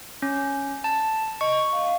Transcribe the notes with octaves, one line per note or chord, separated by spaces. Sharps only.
C#4
A5
D#5 C#6
F5